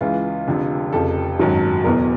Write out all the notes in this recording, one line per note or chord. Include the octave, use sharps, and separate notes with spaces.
C#2 C#3 E3 F4
F1 F2 D3
F1 F2 C#3 A4
G#1 F#2 D#3 F#3
F#1 E2 B2 A#4